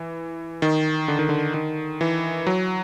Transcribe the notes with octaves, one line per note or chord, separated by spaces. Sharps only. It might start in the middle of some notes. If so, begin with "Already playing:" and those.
Already playing: E3
D#3
D3
D#3
D3
D#3
E3
F#3